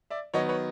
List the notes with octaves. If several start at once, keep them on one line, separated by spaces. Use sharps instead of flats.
D5 E5
D#3 F#3 B3 C#5 D#5
B4 C#5